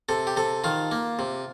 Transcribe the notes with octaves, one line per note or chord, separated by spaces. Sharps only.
C3 A4
G4
C3 A4
D#3 F4
A#3
C3